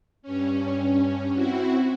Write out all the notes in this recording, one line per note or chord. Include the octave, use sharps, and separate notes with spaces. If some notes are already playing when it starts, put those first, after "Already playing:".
G2 C#4
C4 E4 F#4